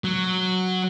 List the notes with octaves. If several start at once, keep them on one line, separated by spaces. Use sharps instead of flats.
F#3